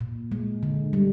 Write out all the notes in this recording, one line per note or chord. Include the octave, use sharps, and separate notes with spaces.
A#2
G#3
D3
G3